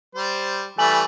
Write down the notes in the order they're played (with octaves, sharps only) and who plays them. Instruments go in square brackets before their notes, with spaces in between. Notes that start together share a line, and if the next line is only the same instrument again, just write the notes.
[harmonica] G3 C5
[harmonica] E3 G3 A3 [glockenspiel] G#5 F#7